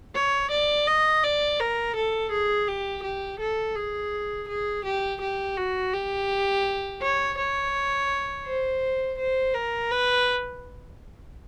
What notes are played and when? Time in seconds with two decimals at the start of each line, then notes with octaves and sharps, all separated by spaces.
0.15 C#5
0.51 D5
0.88 D#5
1.24 D5
1.60 A#4
1.96 A4
2.32 G#4
2.68 G4
3.04 G4
3.40 A4
3.76 G#4
4.49 G#4
4.85 G4
5.22 G4
5.57 F#4
5.94 G4
7.02 C#5
7.38 C#5
8.46 C5
9.19 C5
9.54 A#4
9.91 B4